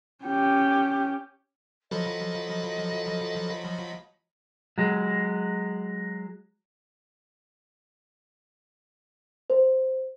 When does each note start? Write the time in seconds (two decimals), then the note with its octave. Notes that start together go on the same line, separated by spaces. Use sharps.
0.25 C#4 G4
1.91 F3 F#3 F#4 A4 D#5 B5
4.78 F#3 G#3
9.50 C5